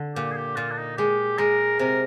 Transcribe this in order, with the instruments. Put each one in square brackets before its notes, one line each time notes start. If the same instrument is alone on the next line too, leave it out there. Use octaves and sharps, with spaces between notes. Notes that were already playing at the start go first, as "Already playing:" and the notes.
Already playing: [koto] D3
[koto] A#2 [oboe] G4
[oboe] G#4
G4
[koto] A#2 [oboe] F4
[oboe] D4
D#4
[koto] G#3 [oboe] G4
[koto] G#3 [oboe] A#4
[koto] C3 [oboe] A#4